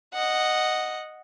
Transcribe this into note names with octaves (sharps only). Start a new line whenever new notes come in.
D#5 F#5